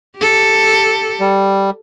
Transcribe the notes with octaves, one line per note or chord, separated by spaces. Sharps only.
G4 A4
G3